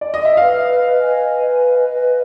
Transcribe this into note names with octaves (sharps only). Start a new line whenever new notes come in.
D5
D#5
E5
B4 F5
D#5
G#5
B4
D#5
B4